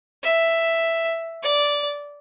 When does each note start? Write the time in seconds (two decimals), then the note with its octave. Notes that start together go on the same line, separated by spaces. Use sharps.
0.23 E5
1.43 D5